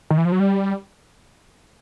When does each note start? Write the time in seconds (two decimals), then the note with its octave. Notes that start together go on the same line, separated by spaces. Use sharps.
0.10 D#3
0.18 E3
0.25 F3
0.32 F#3
0.40 G3